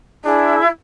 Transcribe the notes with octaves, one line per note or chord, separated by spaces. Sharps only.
D4 E4 G#4